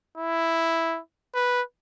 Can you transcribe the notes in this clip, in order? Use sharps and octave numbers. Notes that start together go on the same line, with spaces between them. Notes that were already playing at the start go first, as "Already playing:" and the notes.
E4
B4